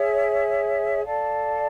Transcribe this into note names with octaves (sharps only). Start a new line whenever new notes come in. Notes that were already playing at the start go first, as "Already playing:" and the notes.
Already playing: G#4 C#5 E5
A4 D5 F5 A5